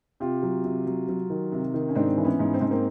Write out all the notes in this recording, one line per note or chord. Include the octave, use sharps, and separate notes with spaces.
C3 F4 G4
F#3
C3
F#3
F#3
D#3
C3
D#3
C#4
G#2 C4 D4
E3
B3 C#4
G#2
C4
G#2 C#4
A#3 C4